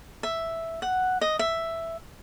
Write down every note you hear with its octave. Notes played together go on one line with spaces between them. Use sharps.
E5
F#5
D#5
E5